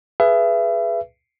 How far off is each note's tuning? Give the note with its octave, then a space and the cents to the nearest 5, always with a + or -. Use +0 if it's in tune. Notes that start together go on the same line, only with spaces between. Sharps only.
G#4 +10 B4 +0 E5 +35